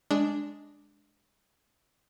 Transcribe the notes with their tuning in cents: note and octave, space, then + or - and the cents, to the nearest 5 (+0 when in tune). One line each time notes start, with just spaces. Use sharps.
G#3 +0 D4 +0